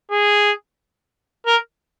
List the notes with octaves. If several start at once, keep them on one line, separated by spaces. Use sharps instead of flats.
G#4
A#4